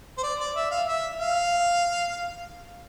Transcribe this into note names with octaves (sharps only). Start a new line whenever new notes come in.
C5
D5
D5
E5
F5
E5
F5